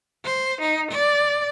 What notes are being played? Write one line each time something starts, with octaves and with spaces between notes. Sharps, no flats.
C5
D#4
D5